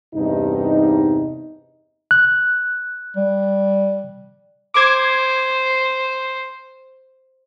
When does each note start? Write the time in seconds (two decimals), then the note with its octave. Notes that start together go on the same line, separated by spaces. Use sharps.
0.15 E2 G2 C3 D#4
2.11 F#6
3.17 G3
4.74 C5 D6 G#6